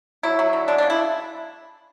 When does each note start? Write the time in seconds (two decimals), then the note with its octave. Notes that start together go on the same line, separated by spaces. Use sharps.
0.23 F#3 E4
0.39 F#3
0.53 D3
0.68 G#3 D4
0.78 C#3 D4
0.90 E4